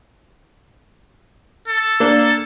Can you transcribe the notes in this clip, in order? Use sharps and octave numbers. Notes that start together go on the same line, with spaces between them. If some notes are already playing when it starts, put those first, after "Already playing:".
A4
A#3 D4